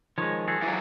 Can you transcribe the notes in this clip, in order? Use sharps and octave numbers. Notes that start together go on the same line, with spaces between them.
D#3 F3 G#3 C#5
F#4 G#4 A4
E3 F#3